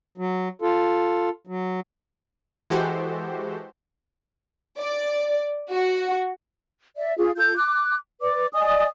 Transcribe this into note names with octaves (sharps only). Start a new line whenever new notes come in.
F#3
F4 A4
F#3
E3 G#3 F#4 G4 A4 C5
D5
F#4
D5 E5
F4 G#4
F4 A4 G6
D6 F#6
B4 D5 D6
D5 D#5 G#5 D#6